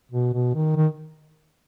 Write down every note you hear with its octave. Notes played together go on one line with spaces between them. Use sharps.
B2
B2
D#3
D#3